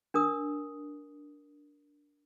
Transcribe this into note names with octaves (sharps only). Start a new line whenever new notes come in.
D4 A#4 D#6